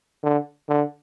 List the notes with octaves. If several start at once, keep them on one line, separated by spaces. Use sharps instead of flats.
D3
D3